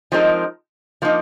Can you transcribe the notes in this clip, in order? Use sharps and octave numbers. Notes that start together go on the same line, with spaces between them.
F3 G#3 C4 D#4 A#4
F3 A#3 D#4